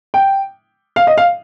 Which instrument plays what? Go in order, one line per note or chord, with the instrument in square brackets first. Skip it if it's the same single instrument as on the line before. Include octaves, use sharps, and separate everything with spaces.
[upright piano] G5
F5
D#5
F5